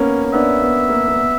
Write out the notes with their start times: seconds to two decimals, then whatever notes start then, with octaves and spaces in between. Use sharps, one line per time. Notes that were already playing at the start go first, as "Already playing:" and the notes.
Already playing: A#3 B3 C#4
0.24 C#4
0.33 B3 D4 E5
0.62 B3
0.89 A#3
1.08 A#3
1.17 B3